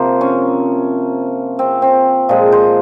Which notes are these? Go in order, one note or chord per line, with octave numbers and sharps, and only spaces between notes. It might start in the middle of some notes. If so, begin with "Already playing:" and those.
Already playing: C3 F3 A#3 C5
C#4
C4
C4
A#2 F3 G#3
C5